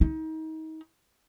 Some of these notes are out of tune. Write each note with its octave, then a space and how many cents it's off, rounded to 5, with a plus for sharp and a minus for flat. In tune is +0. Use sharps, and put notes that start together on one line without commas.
D#4 +30